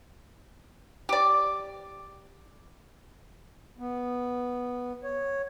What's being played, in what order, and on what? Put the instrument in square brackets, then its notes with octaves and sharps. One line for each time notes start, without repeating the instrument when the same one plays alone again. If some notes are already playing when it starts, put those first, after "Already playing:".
[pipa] G4 D5
[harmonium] B3
C#5